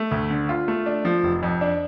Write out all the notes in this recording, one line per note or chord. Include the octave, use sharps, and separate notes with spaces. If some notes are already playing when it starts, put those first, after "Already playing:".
Already playing: A3
D2
D3
F4
A3
D4
F3
F1
F2
D4